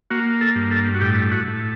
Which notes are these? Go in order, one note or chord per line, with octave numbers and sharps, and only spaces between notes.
A#3 F#4
A4
G2
A4
F#4
A2 G4
F#4
A2